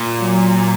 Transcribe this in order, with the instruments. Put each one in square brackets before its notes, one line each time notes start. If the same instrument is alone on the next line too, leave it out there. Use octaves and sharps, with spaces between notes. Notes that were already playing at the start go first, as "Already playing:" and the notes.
Already playing: [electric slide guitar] A#2
[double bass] F#3